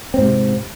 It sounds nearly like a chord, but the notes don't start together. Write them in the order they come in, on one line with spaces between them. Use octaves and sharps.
C4 G#2 C3